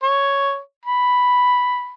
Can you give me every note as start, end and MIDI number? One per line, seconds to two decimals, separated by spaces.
0.03 0.59 73
0.85 1.94 83